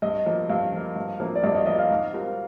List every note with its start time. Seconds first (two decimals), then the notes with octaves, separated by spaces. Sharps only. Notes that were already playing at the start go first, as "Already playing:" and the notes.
0.02 G2 D#5
0.26 F3 A#3
0.49 G2 F5
0.72 F3 A#3
0.96 G2
1.20 F3 A#3
1.35 D5
1.44 G2 D#5
1.55 D#5
1.66 F3 A#3 D#5
1.79 F5
1.90 G#2
2.13 G3 C4 F4 A#4